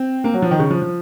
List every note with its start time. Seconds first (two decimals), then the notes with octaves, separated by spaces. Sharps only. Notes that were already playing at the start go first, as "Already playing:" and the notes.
Already playing: C4
0.24 A#3
0.34 F#3
0.42 F3
0.51 D#3
0.59 C#3
0.71 F3
0.82 F3